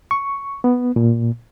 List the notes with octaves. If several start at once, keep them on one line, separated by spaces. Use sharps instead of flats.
C#6
B3
A#2